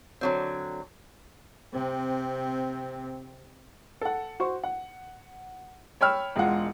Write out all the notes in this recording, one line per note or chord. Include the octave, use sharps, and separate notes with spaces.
D3 F#3 C4
C3 C4
A4 F#5
F#4 C5 C#6
F#5
C#5 G5 B5 E6 F6
E1 G#3 F4 F#5